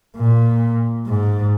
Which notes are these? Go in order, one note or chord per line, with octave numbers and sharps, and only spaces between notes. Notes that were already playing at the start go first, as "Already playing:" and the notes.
A#2
G#2